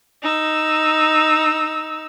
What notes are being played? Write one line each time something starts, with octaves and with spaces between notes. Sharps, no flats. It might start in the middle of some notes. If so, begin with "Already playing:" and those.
D#4 E6